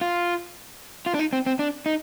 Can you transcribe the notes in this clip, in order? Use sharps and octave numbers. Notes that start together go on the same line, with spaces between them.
F4
F4
D4
D#4
C4
C4
D4
D#4